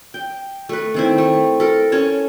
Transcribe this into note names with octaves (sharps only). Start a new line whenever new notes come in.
G5
A3 B4
D#3 C4 E4
A3
A4 A#4
C#4 C#5 A5